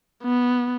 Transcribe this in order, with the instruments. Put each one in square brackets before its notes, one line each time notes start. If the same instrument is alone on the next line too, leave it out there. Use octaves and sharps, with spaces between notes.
[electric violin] B3